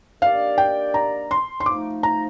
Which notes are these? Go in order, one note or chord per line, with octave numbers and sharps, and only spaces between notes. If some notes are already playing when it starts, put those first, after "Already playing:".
D#3 A#3 D4 G4 D5 F5
G5
A#5
C6
C6
F3 A3 D#4 D6
A#5